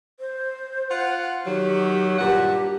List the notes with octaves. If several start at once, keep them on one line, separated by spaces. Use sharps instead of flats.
C5
F4 F#5
D#3 F#3 G4
G2 A#2 G4 F#5